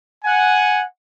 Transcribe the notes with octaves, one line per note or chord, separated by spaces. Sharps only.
F#5 G#5